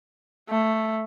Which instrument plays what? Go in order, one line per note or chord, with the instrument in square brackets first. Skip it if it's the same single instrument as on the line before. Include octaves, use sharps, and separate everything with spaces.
[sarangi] A3